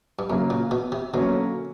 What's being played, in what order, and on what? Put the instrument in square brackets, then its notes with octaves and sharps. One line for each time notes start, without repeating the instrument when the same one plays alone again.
[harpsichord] G2
[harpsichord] F#2 [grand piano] C#3 F#3 A#3
[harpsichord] A#2
B2
C3
[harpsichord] B2 [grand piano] D3 F#3 A#3 C#4